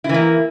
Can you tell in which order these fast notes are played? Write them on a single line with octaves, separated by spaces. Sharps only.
E4 E3 A#3